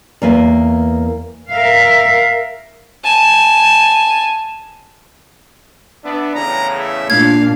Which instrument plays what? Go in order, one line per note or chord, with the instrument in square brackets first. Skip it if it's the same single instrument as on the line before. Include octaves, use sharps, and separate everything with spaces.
[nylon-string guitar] E2 A#3 B4
[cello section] A#4 E5 F5
[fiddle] G#5 A5
[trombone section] B3 D4 [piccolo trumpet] E5
[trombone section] E2 A2 C#3 [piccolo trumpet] A#5
[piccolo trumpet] E5
[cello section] A#2 D4 [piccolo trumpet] F5 [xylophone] G#6